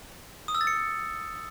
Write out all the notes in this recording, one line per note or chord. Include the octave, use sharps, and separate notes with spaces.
D#6
E6
A6
C#7